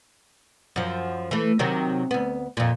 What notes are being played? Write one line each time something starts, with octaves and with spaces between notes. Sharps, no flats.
F#2 F3
E3 A3
C3 D#3 F#3
D2 B3
F2 A#2